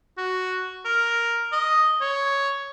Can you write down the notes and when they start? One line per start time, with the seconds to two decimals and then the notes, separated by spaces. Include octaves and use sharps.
0.18 F#4
0.85 A#4
1.52 D#5
2.01 C#5